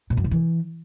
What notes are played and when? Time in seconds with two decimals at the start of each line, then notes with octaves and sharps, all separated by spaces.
0.10 A#2
0.17 F#2
0.24 C3
0.31 E3